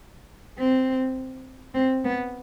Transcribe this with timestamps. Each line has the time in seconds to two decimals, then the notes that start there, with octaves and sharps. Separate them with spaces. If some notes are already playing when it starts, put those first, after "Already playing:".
0.58 C4
1.74 C4
2.04 B3